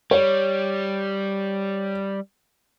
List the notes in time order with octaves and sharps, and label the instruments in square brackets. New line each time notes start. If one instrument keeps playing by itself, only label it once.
[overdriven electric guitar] G3 [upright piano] C#5